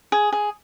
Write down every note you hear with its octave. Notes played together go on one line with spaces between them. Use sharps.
G#4
G#4